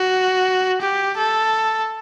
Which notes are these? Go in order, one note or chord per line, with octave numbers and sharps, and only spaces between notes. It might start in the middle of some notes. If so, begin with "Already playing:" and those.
Already playing: F#4
G4
A4